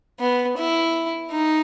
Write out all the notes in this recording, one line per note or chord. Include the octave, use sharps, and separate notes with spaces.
B3
E4
D#4